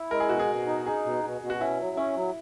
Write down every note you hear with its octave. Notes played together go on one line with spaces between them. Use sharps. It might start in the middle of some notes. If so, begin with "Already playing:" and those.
Already playing: E4
G#3 A#4
G#4
B2 F#4
G#4
B2
D#4
D#4 G#4
B2
B2
B2
F#4
C#4 E4
F#3
C#4 E4
F#3